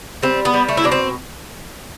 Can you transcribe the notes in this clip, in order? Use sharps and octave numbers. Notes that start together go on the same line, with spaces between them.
G3 C4
B3
G3
A3
E4
B2 D4
C4